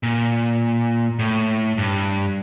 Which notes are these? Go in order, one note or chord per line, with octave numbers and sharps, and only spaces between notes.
A#2
A2
G2